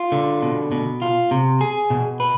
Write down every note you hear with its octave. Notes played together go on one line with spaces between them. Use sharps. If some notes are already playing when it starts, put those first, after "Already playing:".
Already playing: F4
D3
B2
B2
F4
C3
G#4
B2
B4